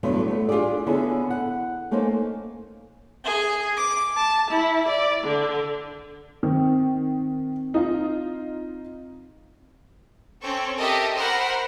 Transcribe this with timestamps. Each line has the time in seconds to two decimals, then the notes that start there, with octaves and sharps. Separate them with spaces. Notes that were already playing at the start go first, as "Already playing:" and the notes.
0.03 E2 G2 D3 F#3 A3 B3
0.28 A3 B3
0.49 D4 F4 G4 G#4 D5
0.86 D3 B3 C#4 E4 G#4 C#5
1.30 F#5
1.91 A3 A#3 C#4 D#4 C5
3.24 G#4
3.77 D6
4.16 A5
4.50 E4
4.88 D5
5.24 D3
6.43 D#3 C4
7.74 D#4 F4
10.41 C4 C#4 A4 C#6
10.78 G4 A4 A#4 D#5 E5
11.17 A#4 C5 F#5 B5